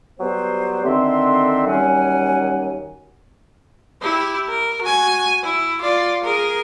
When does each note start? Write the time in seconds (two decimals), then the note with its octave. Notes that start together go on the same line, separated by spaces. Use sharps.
0.20 F#3 G3 B3 G4 B4 C5
0.85 D3 D#3 C4 E5 C6
1.67 D#2 F#3 G3 C#4 F#5 G#5
4.02 E4 G4
4.49 A#4
4.81 F#4 G#5
5.44 E4
5.81 F4 D5
6.24 G#4 A#4